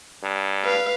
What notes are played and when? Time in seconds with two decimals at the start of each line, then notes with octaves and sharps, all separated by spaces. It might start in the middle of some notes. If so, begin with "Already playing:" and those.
0.23 G2
0.65 B4 F5